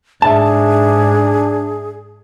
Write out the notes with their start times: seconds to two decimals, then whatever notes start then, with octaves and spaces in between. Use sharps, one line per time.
0.22 G#2 D4 G#4 E5 A5